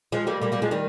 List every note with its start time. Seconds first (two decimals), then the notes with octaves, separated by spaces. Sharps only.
0.12 F3 G#3
0.27 G3 A#3
0.42 G3 A#3
0.52 G3 A#3
0.62 F3 G#3
0.71 D#3 G3